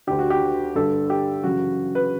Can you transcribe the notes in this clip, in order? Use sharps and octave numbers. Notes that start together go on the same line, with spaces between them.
D2 D3 G4
F#4
G4
G2 D3 A4
G4
F#2 C#3 E3 F#4
B4